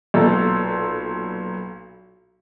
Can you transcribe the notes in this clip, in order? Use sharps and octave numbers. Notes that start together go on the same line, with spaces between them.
B1 A#2 A4 A#5